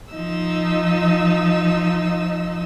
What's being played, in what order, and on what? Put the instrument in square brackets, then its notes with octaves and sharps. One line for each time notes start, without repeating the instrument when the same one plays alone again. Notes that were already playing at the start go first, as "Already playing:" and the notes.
[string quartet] F3 D#4 D#5 E6